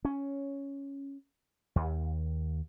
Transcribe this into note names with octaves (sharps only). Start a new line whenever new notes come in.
C#4
D#2